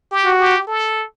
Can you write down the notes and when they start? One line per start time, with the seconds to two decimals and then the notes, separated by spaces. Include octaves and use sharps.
0.11 G4
0.25 F#4
0.39 G4
0.67 A4